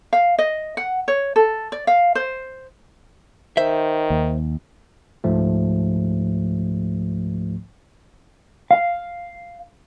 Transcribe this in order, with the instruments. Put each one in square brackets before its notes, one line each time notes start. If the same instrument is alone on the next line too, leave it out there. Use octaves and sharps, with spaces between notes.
[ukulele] F5
D#5
F#5
C#5
A4
D5
F5
C5
[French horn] D#3 [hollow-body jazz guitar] C5 E5
[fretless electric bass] D#2
[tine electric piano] C#2 G#2 F3 A3
[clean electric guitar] F5